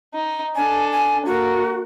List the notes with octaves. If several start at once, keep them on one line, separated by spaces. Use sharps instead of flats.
D#4
D4 A4 G#5
G#5
A#3 F#4